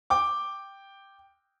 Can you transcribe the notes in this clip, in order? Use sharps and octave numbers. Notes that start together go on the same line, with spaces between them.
G5 D6